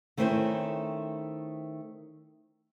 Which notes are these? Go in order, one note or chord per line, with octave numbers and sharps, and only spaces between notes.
D#3 A3 C4 C#4 E4 C5